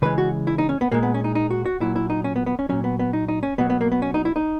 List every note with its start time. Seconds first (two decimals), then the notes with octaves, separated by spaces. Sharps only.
0.02 C#3 E3 G#3 B4
0.18 F#4
0.47 E4
0.58 D#4
0.69 C#4
0.81 B3
0.91 A#2 G#3 A#3
1.03 B3
1.14 C#4
1.24 D#4
1.35 D#4
1.50 F#4
1.66 F#4
1.80 A#2 F#3 E4
1.96 E4
2.10 D#4
2.24 C#4
2.36 B3
2.46 B3
2.59 C#4
2.69 A#2 F#3 C#4
2.84 B3
2.99 B3
3.13 D#4
3.28 D#4
3.43 C#4
3.58 B2 F#3 B3
3.70 B3
3.81 A#3
3.92 B3
4.02 C#4
4.14 D#4
4.25 E4
4.36 D#4